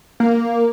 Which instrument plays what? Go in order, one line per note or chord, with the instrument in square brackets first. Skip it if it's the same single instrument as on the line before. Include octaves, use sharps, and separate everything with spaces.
[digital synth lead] A#3